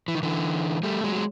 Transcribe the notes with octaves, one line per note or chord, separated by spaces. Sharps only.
E3
D#3
D3 E3
G3 A3
F#3 G#3
G#3